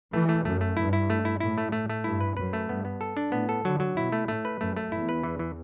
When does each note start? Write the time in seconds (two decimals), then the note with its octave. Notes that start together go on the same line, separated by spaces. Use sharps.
0.13 E3 A3
0.29 A3
0.45 F#2 A3
0.61 A3
0.77 G2 E4
0.93 E4
1.10 A3
1.25 E4
1.40 A2 E4
1.58 A3
1.72 A3
1.90 A3
2.04 G2 E4
2.21 B4
2.37 F#2 B4
2.53 A3
2.69 G2 B3
2.85 B3
3.01 A4
3.17 D4
3.32 A2 B3
3.49 A4
3.65 D3 F#3
3.80 F#3
3.96 B2 E4
4.12 A3
4.28 A2 A3
4.45 B4
4.60 F#2 A3
4.77 A3
4.92 E2 E4
5.09 B4
5.23 E3
5.39 E3